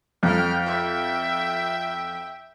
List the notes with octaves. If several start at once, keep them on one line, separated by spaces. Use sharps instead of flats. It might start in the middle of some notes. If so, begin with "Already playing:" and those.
F2 G5 F6
E5 G5